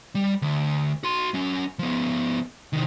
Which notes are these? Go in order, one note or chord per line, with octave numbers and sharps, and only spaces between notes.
G3
D2
F#4 C6
F#3 C#4
F3 B3
C3 D#3